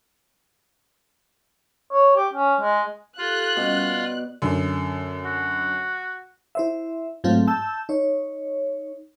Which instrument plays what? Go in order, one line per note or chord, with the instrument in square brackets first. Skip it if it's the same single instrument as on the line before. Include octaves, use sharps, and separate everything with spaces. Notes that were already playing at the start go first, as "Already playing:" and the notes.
[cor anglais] C#5
G4
C#4
G#3
[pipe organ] F4 [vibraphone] G4 A4 [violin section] F#6
[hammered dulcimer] B2 [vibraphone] G3 C#4
[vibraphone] D5
[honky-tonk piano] F#2 D3
[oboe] F#4
[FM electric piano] E4 C5 E5
G#2 F#3 A3 C4 F4
A5 E6 G6
D#4 C#5